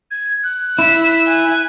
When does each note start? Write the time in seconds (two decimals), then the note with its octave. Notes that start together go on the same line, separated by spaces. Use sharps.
0.11 G#6
0.44 F#6
0.79 E4 E6 B6
1.28 G#5 F#6